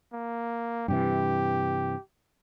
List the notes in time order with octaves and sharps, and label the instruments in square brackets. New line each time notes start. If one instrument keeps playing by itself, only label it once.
[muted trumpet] A#3
[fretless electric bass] G2 C3 E3 [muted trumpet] G4